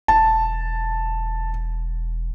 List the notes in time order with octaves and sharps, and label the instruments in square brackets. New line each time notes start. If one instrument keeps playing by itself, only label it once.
[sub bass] E1 [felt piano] A5